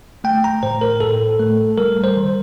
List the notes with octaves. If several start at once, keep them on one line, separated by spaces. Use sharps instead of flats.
A3 G5
A#5
A2 C5
A#4
A2 A4
A3
G3 A#4
C5
D#3